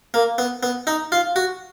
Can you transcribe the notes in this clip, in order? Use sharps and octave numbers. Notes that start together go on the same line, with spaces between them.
A#3
B3
B3
D#4
F4
F#4